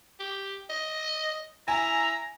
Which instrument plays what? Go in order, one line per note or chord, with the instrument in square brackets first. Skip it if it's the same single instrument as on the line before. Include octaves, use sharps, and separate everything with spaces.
[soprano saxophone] G4
D#5
[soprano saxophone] E4 [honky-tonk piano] G#5 [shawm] A#5